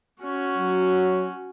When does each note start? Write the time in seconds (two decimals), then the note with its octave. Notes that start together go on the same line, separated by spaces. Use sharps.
0.24 C#4 F#4
0.58 F#3